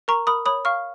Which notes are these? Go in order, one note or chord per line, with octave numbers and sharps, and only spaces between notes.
A#4 A#5 C#6
A#4 B5 D#6
C#5 B5 D#6
F5 C#6 F6